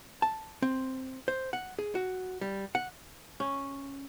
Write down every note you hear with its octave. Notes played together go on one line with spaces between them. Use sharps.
A5
C4
C5
F#5
G#4
F#4
G3
F#5
C#4